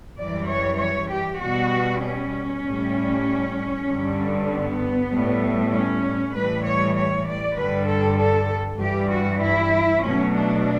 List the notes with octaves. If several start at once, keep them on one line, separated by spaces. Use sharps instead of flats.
F#2 E3 G3 D5
C#5
C#5
G4
B2 G3 F#4
C#4
A2 G3
G2 D3 G3
B3
A2 G3
C#4
A2 E3 G3 B4
C#5
C#5
D5
G2 D3 G3 B4
A4
A4
G2 E3 G3 G4
F#4
E4
B2 F#3 A3 C#4
D4